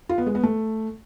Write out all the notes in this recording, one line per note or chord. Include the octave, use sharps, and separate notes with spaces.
F4
B3
G#3
B3
A3